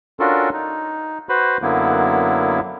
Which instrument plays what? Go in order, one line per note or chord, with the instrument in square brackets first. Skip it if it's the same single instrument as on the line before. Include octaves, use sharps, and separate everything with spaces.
[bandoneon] C#4 D4 F4 F#4 A4 A#4
D#4
F#4 B4 C5 B5
F#2 D3 F#3 A#3 B3 E4